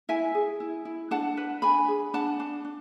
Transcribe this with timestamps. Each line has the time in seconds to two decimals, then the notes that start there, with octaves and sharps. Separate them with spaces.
0.09 E4 E5 G#5
0.34 G#4
0.60 E4
0.85 E4
1.11 D4 F#5 A5
1.37 B4
1.62 D4 G#5 B5
1.88 G#4
2.14 D4 F#5 A5
2.40 D4
2.65 D4